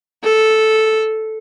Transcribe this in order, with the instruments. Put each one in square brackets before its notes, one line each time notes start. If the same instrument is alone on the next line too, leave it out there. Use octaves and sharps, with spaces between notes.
[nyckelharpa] A4